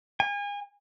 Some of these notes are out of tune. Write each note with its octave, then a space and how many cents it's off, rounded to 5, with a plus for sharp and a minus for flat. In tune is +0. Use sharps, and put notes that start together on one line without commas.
G#5 -35